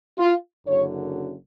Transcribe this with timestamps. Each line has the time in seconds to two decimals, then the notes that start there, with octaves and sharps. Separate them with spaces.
0.19 F4
0.67 F#1 F#2 D3 F#3 C#5